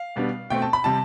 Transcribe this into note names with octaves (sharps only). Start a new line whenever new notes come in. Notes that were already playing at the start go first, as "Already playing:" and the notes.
Already playing: F5
B2 G3 B3 D4
B2 A3 C4 G5
A5
B5
C3 G3 A5